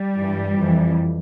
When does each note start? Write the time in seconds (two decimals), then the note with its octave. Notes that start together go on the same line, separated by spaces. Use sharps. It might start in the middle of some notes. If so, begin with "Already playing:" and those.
Already playing: G3
0.18 G2 E3
0.58 F2 E3